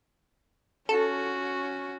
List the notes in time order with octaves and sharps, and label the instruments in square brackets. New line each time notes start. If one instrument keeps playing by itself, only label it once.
[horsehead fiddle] C#4 F#4 [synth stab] A4